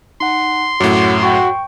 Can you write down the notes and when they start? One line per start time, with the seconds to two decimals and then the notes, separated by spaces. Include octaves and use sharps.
0.21 D#4 F#5 C6
0.80 F#2 A2 F#4 C#5 D6
1.22 F#4 G5 C#6